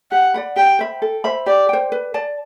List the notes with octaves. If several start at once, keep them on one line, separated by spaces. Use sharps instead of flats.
G4 F#5
D5 F#5 B5
G4 G5
C5 E5 B5
A4
C5 E5 B5
G4 D5
C5 G5
B4
D5 A5